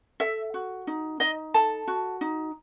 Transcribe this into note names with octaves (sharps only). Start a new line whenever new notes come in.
A4 E5
F#4
D#4
D#4 D#5
A4 A5
F#4
D#4